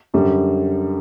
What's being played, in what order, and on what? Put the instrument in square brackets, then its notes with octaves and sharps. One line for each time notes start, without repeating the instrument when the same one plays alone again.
[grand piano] F#2 D3 G3